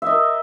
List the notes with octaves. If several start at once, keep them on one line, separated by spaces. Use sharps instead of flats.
A#4 D#5 E5